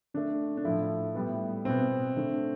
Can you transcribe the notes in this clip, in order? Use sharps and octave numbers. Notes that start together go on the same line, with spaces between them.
D3 A3 D4
D4
A2 F3 A3 E4
A2 G3 B3
B2 B3 C4
D3 A3